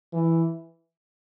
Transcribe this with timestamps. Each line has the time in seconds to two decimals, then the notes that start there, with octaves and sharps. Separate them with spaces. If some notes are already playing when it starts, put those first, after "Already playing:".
0.13 E3